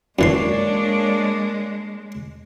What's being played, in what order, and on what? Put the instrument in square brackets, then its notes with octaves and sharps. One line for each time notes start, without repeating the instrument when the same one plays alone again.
[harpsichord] F#2 E3 C6 [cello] G#3 [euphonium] A#3 [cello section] D4 C#5 D5